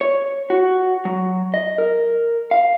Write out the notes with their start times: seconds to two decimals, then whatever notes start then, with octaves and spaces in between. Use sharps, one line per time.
0.01 C#5
0.50 F#4
1.05 F#3
1.54 D#5
1.78 A#4
2.51 F5